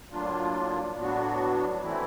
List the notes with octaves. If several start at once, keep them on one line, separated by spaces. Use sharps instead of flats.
A2 F#3 A#3 D4 F4
A2 F#3 B3 D4 F#4
E3 A3 C4 E4